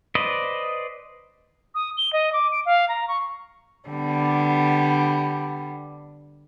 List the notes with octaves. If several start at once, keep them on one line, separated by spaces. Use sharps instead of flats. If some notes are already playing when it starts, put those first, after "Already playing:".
B4 C5 D5 D#5
D#6
G7
D#5
D6
D7
F5
A#5
C#6
D3 G3 B3